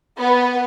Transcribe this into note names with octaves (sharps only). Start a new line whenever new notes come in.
B3